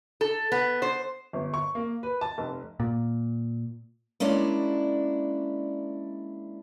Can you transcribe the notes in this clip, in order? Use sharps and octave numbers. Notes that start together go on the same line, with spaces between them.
A4
B3
C5
G1
C#6
A#3
B4
A5
F1
A#2
G#3 A#3 C#4 D4 E4 D5